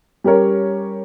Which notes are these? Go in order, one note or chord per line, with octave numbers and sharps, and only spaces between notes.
G3 C#4 G4 A#4 C#5